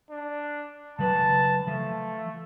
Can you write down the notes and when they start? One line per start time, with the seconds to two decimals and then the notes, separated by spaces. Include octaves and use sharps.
0.11 D4
0.99 C#3 F#3 B4 A5
1.67 F3 A3